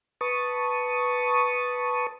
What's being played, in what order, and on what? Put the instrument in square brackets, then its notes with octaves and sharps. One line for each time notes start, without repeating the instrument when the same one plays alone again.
[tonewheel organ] B4 A5 C#6 D#6